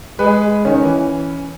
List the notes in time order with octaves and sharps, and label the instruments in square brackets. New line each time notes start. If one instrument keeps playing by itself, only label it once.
[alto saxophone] G#3 [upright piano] B4
[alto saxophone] D#3 [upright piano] C#4
[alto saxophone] E3